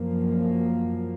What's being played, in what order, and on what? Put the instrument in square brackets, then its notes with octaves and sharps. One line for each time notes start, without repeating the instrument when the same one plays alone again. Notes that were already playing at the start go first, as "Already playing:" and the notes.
Already playing: [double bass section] F#2 F3 A#3